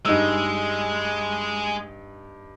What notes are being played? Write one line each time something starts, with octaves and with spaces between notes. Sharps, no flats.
G2 G#3 D#4 E6